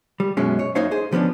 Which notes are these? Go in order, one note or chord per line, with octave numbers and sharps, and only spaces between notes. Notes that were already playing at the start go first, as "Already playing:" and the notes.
G3
F#2 B2 G#3 C#4
C#5
F#2 A#3 D#4 C5 C#5 F5
G#4 C5
F3 B3 C#4 D4